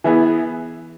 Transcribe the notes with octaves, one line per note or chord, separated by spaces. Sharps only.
E3 B3 E4 G#4